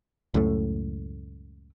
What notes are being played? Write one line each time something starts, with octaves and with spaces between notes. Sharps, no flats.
C#2 F#2 A2 A3